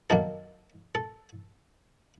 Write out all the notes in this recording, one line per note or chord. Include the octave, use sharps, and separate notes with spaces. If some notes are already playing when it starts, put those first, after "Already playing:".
F#2 D#3 F#3 A#3 A4
A4